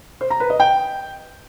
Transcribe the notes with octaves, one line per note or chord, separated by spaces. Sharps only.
C5
A#5
B4
D#5
G5